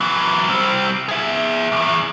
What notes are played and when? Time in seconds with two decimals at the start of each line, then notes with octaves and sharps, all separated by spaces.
0.01 E3 F#3
0.49 G3 C4
1.09 G#4 E5
1.72 B1 E2